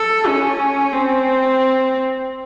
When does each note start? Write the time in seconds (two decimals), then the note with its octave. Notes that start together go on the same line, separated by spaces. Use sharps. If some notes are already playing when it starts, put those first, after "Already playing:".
Already playing: A4
0.26 C#4
0.92 C4